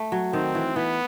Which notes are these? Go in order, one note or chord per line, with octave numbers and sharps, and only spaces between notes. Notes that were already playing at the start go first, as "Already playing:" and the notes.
Already playing: A3
F#3
D#3 C4
E3
E3 B3